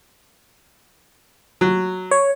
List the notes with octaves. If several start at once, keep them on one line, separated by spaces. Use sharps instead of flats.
F#3
C#5